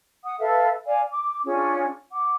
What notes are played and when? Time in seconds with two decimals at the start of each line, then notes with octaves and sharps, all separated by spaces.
0.24 F#5 D#6
0.39 A4 B4 E5 F5
0.85 D5 F5 G#5
1.11 D6
1.46 C#4 D4 F4 G#4
2.11 F#5 D6